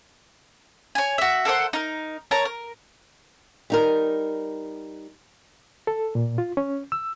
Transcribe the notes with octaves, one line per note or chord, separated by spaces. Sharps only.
C#5 G#5
F#4 E5
A4 A#4 C5 F#5
D#4 A#4
A#4 C#5 A5 A#5
A#4
G3 D#4 A#4
A4
A#2
F4
C#4
E6